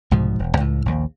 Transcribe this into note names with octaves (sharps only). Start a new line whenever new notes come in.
C2 G#2 B2 F3
E1
C#2 A2
A#1 D#2